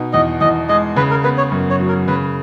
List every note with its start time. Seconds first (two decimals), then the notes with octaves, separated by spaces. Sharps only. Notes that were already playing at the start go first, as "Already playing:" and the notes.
Already playing: B2 D#4
0.13 E2 D#5
0.41 E2 D#5
0.69 G#3 D#5
0.96 C#3 B4
1.11 A#4
1.24 B3 B4
1.38 C#5
1.52 F#2
1.70 C#5
1.80 F#3
1.88 A#4
2.07 C#3 B4